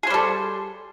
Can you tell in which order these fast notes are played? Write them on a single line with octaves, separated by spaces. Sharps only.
G#4 C5 G3 A4